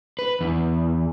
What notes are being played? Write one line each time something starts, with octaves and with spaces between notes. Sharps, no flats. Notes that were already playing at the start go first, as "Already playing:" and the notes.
B4
E2